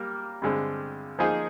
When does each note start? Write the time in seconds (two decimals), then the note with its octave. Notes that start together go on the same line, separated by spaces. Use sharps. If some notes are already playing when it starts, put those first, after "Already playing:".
Already playing: G3 A#3 A#4
0.42 G2 D3 G#3 C4
1.19 F3 A#3 D#4 G#4 C5